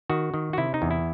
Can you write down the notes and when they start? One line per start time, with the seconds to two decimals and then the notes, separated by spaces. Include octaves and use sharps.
0.10 D#3 F#4
0.34 D#3
0.53 F#4
0.58 C3 E4
0.74 D#4
0.82 E2
0.90 E4